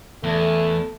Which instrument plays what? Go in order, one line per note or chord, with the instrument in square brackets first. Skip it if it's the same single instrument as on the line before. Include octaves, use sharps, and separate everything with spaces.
[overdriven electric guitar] E2 [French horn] A3